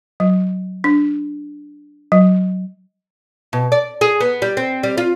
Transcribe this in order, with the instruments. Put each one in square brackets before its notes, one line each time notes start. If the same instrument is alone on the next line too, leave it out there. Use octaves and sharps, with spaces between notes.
[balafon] F#3
D4
F#3
[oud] B2
D5
G#4
B3
G3
C4
G3
F4